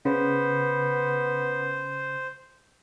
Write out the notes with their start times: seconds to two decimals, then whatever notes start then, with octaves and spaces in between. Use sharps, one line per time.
0.05 C#3 B3 C5